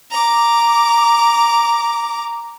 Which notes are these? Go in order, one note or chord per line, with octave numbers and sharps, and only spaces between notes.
A#5 D6